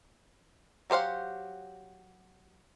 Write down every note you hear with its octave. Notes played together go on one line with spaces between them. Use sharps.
F#3 G4 C5 F5 F#5